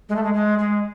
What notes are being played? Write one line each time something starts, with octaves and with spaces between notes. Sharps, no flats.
G#3
A3
G#3
G#3
G#3